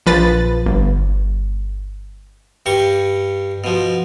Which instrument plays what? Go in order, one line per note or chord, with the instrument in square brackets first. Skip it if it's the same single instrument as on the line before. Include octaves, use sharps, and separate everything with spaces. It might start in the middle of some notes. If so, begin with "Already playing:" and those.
[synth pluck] A#1 F3 B4 A6
G1
[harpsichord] G2 G3 C#6
B2 F3